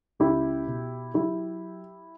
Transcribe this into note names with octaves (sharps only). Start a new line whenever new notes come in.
C#2 E4 G4
B2
F#3 E4 G4